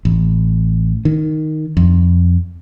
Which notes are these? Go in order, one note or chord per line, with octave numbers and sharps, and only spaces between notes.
A1
D#3
F2